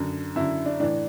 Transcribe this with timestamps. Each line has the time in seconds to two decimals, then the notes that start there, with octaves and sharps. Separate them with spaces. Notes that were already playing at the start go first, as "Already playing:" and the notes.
Already playing: F#2 D3
0.36 F#2 D3 E4
0.66 D4
0.80 A2 E3 D4